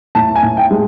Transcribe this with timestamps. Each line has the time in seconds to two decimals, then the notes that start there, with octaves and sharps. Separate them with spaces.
0.15 A2 A5
0.36 G#5
0.43 A2
0.57 G5
0.71 G#3